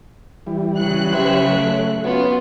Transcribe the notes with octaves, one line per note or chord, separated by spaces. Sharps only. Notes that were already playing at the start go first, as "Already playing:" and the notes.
E3 G3
C#3 F#3 F#6
C#4 G4 B4 C5 E5
A3
B3 C#4 F4 F#4